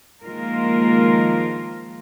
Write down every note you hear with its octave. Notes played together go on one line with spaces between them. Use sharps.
D#3 F3 G#3 A#3 F4 A#4